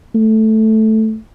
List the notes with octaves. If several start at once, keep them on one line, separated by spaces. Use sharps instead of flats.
A3